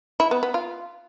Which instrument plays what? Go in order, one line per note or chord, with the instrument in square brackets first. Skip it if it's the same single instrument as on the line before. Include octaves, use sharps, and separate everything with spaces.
[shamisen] E4
B3
B3
F4